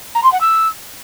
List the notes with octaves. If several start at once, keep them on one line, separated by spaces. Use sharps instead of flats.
A#5
C6
F#5
E6